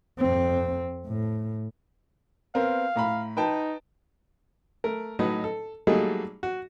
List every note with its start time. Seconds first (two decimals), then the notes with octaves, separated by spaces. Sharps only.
0.19 F2 C4
1.07 A2
2.55 B3 C4 A#4 F5
2.96 A2 A#5 B5
3.37 D#4 B4 G5 A5
4.84 A3 A#4
5.19 A2 F#3 D#4 B4 D#5
5.44 A4
5.87 F#3 G3 A3 A#3 D#4 G#4
6.43 F#4